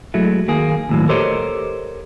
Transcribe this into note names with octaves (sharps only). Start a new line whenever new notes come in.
F#3 G#3 A3 E4
D#2 A#3 G#4
D#2 A2 F#3
G4 A4 A#4 C5 C#5 D#5